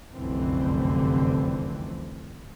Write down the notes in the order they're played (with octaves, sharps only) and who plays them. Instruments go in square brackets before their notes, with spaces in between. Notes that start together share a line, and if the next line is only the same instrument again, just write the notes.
[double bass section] F1 C2 F#2 D3 E3 C4